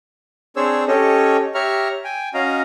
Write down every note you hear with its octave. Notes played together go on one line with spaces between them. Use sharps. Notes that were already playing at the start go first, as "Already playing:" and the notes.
C4 D4 G#4 C5 C#5 E6
C#4 G4 A4 C#5 D#5
G4 C#5 E5 A#5 C#6 F6
G5 G#5
C#4 F#4 D#5 F5 A#5